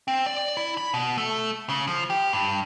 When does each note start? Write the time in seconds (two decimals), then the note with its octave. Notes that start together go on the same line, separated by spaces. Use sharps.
0.08 C4
0.26 D5
0.57 E4
0.77 B5
0.94 B2
1.18 A3
1.69 C#3
1.87 F3
2.10 G4
2.33 G2